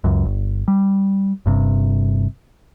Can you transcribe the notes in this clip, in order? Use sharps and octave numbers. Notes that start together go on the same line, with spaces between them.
C#2 F#2
G1
G3
G1 G2 C3